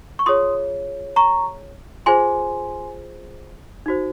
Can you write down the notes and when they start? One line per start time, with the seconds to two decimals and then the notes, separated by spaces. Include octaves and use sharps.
0.19 C#6
0.26 F4 G#4 C#5 C6 D#6
1.16 A#5 C#6
2.06 F4 G#4 C5 G#5 C6
3.86 D#4 F#4 C5